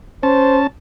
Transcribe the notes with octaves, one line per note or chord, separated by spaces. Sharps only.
C#4 C5 A5